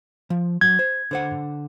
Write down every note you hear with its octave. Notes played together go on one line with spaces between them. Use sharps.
F3
F#3 G#6
C5
D3 C5 F#5